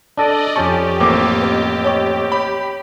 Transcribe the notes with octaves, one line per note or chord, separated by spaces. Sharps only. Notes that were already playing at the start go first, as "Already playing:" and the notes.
D4 A4 D5 D#5
F2 C#4 G4 A5 C#6
A1 A#3 C4 D6
B4 D#5
C#5 D#5 C#6
C#5 B5